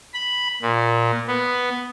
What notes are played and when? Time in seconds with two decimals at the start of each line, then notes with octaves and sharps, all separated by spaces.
0.14 B5
0.62 A#2
1.28 B3